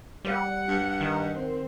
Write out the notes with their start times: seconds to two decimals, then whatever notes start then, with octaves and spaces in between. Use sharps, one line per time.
0.24 G3 F#5
0.68 G2
1.01 D#3
1.34 C4